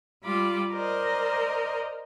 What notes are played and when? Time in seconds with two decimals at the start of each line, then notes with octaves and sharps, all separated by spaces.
0.23 G3 F4 B5 D6
0.72 A#4 C5 D5 D#5